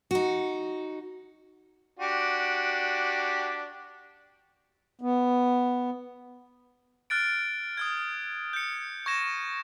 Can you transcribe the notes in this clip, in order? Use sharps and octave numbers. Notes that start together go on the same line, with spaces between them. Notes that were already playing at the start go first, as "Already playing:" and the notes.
D#4 F#4
D4 F#4 G4
B3
F6 F#6 A6 D7
D#6 F6 G#6
G6 C#7
C#6 G#6 A#6 E7